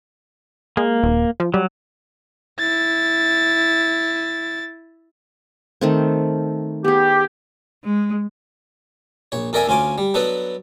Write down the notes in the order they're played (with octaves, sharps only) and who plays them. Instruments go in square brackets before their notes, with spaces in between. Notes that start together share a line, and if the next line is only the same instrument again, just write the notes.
[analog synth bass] G#3 [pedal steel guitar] A#3
[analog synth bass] D#1
F3
[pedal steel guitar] F#3 [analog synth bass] G3
[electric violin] E4 A6
[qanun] D#3 A3 C4
[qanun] B3 G#4 [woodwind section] G4
[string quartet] G#3
[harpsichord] A#1 C#5
F2 A4 A#4 D5 E5 G#5
D2 C#4 F4 G#5 D6
G3
F#3 B3 D4 A4 B4